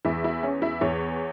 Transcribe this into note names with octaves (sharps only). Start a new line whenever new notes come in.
E2 E3 E4
E4
C#4
E4
E2 E3 C#5